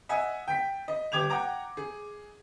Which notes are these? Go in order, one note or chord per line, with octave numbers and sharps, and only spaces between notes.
D#5 E5 F#5 G#5
G5 B6
D#5
G1 G4 D6 G#6 F7
F#5 G5 A#5 D6
G#4